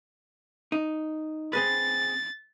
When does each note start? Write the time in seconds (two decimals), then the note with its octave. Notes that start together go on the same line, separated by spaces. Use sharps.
0.72 D#4
1.53 C4 G#4 B4 A6